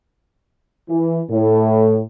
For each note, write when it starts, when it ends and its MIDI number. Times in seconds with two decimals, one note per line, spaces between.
0.89 1.19 52
1.30 2.00 45